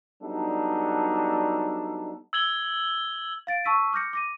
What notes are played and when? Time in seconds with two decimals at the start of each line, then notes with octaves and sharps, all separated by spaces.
0.23 F#3 G3 B3 D4 D#4 A4
2.33 E6 G#6 F#7 G7
3.47 F5 A6 D7
3.64 A5 C#6 E6 B6 D#7
3.93 D6 F6 G6 A#6 C#7
4.13 D6 A#6 D#7